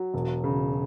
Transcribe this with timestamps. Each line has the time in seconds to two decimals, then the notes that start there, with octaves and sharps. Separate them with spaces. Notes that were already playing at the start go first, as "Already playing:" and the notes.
Already playing: F#3
0.14 E1
0.44 C#3